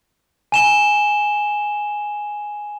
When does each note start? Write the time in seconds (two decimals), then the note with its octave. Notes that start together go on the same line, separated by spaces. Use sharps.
0.52 G#5 E7 G7